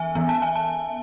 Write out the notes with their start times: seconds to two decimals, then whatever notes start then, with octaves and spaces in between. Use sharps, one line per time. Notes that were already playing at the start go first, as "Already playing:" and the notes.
Already playing: E3 B3 E5 G#5
0.15 E3 B3
0.29 A5
0.42 G#5
0.55 A5